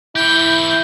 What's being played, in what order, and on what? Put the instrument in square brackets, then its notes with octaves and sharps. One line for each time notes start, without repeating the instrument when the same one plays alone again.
[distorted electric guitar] E3 G4 [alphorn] E4 [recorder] G6